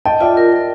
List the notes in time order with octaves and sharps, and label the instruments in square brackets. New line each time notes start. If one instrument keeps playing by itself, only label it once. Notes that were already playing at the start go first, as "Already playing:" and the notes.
[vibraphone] D#5 [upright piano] G5 A5
[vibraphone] F4 [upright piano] D5 E5
[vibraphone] A#4
A#4